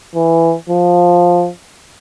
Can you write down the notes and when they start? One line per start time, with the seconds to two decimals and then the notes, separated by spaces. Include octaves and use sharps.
0.15 E3
0.70 F3